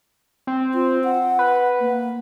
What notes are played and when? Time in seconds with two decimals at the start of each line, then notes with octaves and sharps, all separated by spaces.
0.47 C4
0.74 F4
1.04 F#5
1.39 B4
1.80 A#3